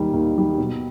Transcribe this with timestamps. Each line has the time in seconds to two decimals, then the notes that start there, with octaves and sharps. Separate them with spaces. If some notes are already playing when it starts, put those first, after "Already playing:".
Already playing: D#2 D#3 G3
0.13 D#2
0.36 D#3 G3
0.58 B2